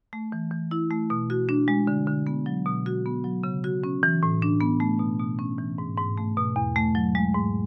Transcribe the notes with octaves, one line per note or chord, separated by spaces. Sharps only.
A3
E3
E3
E4
A3
B2
F#4
D4
G#3
D3
D3
B3
F#3
B2
F#4
B3
F#3
C#3
F#4
C#4
E3
A2
D4
B3
A3
B2
B2
C#4
E3
G#2
G#2
A3
B2
E2
A3
F#3
G#3
G#2